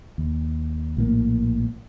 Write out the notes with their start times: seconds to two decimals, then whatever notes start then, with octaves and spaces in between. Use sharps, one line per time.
0.18 D#2
0.97 A#1 A2 A#3